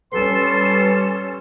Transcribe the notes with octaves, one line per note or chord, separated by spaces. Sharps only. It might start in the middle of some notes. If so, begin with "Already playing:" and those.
G3 C#4 A4 B4 C6